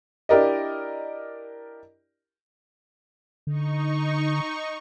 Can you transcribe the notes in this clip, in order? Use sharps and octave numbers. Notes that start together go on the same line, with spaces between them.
D4 E4 G4 A#4 D5 D#5
D3 D#4 C#6